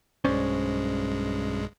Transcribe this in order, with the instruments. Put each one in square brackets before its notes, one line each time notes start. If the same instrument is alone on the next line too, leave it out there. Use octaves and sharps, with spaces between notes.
[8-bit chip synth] B1 G2 G#3 [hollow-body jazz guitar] C#4 C5 D5